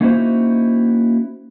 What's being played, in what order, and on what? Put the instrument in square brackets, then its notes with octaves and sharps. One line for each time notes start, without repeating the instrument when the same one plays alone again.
[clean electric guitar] A#3 C#4 D#4 E4 F#4 C5